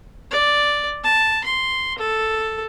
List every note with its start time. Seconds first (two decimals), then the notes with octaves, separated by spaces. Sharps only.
0.31 D5
1.04 A5
1.44 C6
1.98 A4